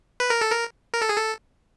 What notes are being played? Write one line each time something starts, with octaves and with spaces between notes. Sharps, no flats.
B4
A#4
A4
A#4
A#4
A4
G#4
A4